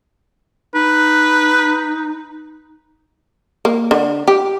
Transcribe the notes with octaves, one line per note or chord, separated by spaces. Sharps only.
D#4 B4
A#3
D3
G4